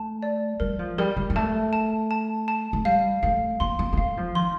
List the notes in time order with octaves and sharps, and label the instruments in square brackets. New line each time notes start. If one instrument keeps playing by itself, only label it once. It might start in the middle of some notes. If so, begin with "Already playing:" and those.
Already playing: [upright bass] A3 [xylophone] A5
[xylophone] D5
[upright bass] G3 [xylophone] A#4
[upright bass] F3
[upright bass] G3 [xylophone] A#4
[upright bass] G3
G3
[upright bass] A3 [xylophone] A5
[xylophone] A5
A5
A5
[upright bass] A3
[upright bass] G3 [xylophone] F5
[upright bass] A3 [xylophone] F5
[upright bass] A#3 [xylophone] C6
[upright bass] A#3
A#3
[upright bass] A3 [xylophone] F5
[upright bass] F3
[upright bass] D#3 [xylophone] C6